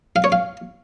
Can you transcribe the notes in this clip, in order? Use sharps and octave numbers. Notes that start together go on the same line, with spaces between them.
F5
C#5
F5